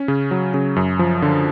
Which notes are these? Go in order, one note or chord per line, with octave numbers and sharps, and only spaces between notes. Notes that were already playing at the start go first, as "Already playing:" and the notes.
Already playing: C#4
C#3
F#3
C#3
F#2
F3
D3